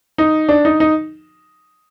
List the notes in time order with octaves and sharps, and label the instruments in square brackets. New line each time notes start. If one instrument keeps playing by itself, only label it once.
[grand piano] D#4
D4
D#4
D#4